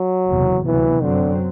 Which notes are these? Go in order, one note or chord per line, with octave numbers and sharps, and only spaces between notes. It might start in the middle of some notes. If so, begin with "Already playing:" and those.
Already playing: F#3
F#1 E2 C3
D2 C3 E3 F#3 B3
F#2 D3 F#3 C4